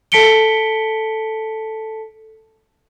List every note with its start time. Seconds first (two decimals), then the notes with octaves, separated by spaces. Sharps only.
0.12 A4 A5 B6 C#7 D7 G7